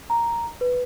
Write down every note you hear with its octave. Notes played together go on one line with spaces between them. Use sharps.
A#5
B4